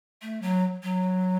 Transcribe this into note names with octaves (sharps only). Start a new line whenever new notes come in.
A3
F#3
F#3